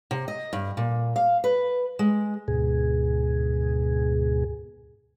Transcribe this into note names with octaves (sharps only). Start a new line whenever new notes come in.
C3
D#5
G2
A#2
F5
B4
G#3
D2 G#2 B2 G#4